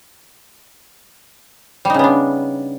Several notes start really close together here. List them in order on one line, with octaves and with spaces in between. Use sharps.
G3 D#4 C#3 B3 D4